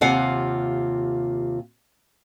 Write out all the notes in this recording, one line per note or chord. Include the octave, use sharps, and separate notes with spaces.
D#2 C3 F4 F5 F#5 G#5